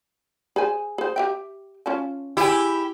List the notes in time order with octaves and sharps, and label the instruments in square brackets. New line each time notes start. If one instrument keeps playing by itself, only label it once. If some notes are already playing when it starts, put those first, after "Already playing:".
[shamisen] G#4 C5 G#5
G#4 C5
G4 E5 G5
C#4 F4 A5
[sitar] E4 G4 [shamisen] G#4 G#5